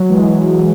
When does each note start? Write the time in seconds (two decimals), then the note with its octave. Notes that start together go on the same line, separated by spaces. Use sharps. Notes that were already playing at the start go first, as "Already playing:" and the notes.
Already playing: F#3
0.09 E3 G#3
0.27 F#3